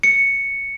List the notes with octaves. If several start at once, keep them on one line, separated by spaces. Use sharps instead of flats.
C#7